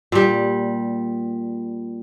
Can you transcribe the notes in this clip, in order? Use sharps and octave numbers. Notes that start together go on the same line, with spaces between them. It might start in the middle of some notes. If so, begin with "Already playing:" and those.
A#2 G3